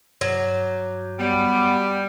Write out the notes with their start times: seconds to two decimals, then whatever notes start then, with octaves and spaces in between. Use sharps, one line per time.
0.21 G2 F#3
1.19 G3 B3